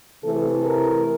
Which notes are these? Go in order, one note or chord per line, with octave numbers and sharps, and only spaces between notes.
C3 E3 A3 A4
A#4